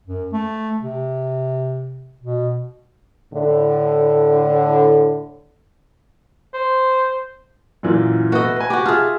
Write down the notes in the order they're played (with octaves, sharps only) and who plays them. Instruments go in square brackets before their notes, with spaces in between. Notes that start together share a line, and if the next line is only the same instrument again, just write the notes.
[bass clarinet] F#2
A3
C3
B2
[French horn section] A2 D3
[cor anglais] C5
[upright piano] F#2 A#2 E3
[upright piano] A3 B3 B4 [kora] F#4 D#5
[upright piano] B4 G#5
[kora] F#4 G4
[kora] F4 G#4 [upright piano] E5 A5